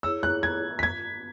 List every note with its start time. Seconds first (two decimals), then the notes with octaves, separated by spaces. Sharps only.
0.03 E4 G#4 C#5 E6
0.23 F#6
0.43 G#6
0.79 B6
0.83 G#6